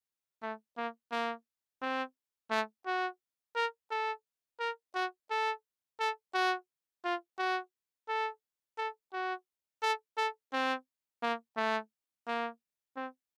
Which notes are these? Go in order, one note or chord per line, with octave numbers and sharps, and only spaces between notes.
A3
A#3
A#3
C4
A3
F#4
A#4
A4
A#4
F#4
A4
A4
F#4
F4
F#4
A4
A4
F#4
A4
A4
C4
A#3
A3
A#3
C4